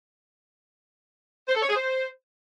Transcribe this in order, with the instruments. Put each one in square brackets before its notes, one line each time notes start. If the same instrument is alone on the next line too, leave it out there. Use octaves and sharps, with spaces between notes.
[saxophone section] C5
A4
C#5
G#4
C5